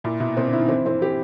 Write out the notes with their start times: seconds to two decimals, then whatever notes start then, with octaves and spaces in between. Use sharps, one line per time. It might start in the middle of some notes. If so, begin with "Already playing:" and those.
0.04 A#2 E4
0.20 B2 E4
0.37 B2 C4
0.47 D3
0.53 E4
0.58 D#3
0.68 E3 C4
0.85 E3 C4
1.01 E3 G4